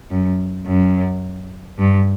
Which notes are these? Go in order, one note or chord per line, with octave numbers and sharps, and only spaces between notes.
F#2
F#2
G2